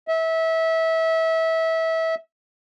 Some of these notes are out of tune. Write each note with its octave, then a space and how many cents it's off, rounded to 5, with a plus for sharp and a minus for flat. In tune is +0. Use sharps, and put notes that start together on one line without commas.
E5 -25